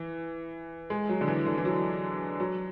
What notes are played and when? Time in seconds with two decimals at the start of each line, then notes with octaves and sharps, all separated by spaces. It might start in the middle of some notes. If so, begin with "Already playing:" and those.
Already playing: E3
0.90 G#3
1.09 F#3
1.21 D3
1.28 E3
1.46 D3
1.58 E3
1.65 F#3
2.40 F#3